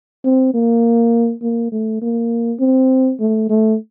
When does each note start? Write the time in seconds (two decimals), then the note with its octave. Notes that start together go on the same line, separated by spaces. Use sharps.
0.24 C4
0.54 A#3
1.42 A#3
1.72 A3
2.02 A#3
2.60 C4
3.20 A3
3.50 A3